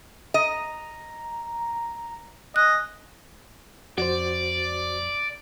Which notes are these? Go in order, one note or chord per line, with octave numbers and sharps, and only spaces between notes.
D#5 A#5
D#5 G#5 F#6
F2 F#4 C5 D5